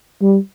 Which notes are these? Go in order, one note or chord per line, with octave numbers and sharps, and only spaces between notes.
G3